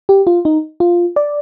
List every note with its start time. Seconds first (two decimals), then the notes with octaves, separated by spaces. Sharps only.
0.09 G4
0.27 F4
0.45 D#4
0.80 F4
1.16 D5